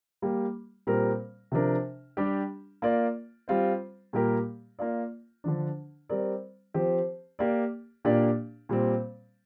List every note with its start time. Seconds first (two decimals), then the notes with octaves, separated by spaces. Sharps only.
0.22 G3 A#3 G4
0.87 A#2 G3 C4 A#4
1.52 C3 F3 D4 A#4
2.17 G3 D4 G4
2.82 A#3 F4 A#4 D5
3.48 G3 C4 F4 C5
4.13 A#2 G3 A#3 G4 A#4
4.79 A#3 F4 D5
5.44 D3 F3 D4
6.09 G3 C4 A#4 D5
6.74 F3 C4 G4 C5
7.39 A#3 G4 D5
8.05 A#2 A#3 D4 G4 D5
8.69 A#2 G3 C4